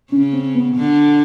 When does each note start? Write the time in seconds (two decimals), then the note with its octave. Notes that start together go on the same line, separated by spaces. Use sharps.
0.12 C#3 C#4
0.33 C4
0.55 B3
0.75 D3